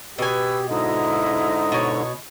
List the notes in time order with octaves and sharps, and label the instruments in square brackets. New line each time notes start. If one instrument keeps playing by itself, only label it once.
[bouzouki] B2 G#5 [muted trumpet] G4 [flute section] B4 E6
[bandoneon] G#2 D3 [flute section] E4 A#5 D#6 [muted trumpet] D#5
[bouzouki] B2 C#5